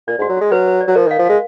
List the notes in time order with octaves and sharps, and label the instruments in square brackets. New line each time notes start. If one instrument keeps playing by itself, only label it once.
[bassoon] A#2 [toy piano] D5
[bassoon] G#2
[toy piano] F#4
[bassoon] F#3
[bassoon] G#3 [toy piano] F#4
[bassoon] F#3 [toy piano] B4
[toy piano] B4
D5
[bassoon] F#3
[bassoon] F3 [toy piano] A#4
[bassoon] D#3
[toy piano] F5
[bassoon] F3
[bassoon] G#3 [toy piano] F5